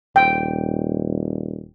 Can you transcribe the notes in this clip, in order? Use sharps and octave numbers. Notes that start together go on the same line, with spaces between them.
D#1 G5